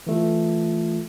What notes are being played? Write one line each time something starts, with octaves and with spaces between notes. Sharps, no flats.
E3 A3 F4